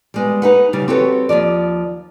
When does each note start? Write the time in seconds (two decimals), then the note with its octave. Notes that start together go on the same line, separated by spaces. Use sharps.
0.14 G3 G#3 B3
0.42 D#4 B4 F#5
0.73 C#3 G3
0.88 C4 F#4 G4 A4 B4 C#5
1.29 D#2 B2 F3 D5